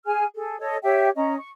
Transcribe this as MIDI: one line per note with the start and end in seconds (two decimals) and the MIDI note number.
0.06 0.24 68
0.06 0.24 80
0.06 0.24 89
0.35 0.59 68
0.35 0.59 69
0.60 0.76 69
0.60 0.76 73
0.60 0.76 75
0.83 1.08 67
0.83 1.08 73
0.83 1.08 76
0.83 1.08 79
1.16 1.37 61
1.16 1.37 75
1.16 1.37 82
1.37 1.49 85